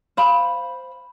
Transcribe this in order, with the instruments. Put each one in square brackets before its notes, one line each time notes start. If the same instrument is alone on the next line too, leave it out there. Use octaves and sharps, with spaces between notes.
[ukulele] C5 F5 B5